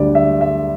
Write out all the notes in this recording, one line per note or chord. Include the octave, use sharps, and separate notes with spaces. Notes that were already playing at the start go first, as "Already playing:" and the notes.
Already playing: D2 D3 G3 D5
E5
E5